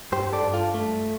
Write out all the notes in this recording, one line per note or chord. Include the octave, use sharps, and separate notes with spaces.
G2 G4 C5
A4 D5
G2
F4 A4
A3